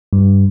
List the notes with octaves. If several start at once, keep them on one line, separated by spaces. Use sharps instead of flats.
G2